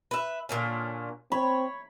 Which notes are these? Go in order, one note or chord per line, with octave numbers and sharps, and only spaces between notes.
B4 E5
A#2 D3 C#4
C4 C#5 B5